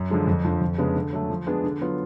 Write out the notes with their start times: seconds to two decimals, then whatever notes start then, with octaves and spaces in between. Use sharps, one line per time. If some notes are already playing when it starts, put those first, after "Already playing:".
Already playing: F#2
0.10 D3 F3 G#3 D4
0.27 F2
0.45 D3 F3
0.61 F2
0.78 C#3 G#3 B3 D4
0.95 D3
1.13 F#3 A3
1.30 F3
1.47 G#3 B3 D4 G#4
1.64 D3
1.81 F#3 B3 F4